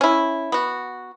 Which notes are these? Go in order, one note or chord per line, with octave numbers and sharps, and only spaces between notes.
C#4 E4
B3 F#4